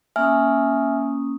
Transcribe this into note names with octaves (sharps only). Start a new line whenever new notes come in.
A#3 C#4 E5 G#5 D#6 F6